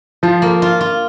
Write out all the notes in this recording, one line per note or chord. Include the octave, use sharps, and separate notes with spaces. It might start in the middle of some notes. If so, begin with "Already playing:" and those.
F3 F4
A#3
F4
F4